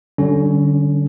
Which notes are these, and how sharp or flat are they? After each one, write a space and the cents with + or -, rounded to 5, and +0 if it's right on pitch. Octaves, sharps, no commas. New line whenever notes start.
D3 +0 G3 -35 C#4 +15